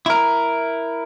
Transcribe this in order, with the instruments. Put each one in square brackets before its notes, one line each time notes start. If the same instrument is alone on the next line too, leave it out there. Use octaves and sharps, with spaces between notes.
[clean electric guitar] E4 A#4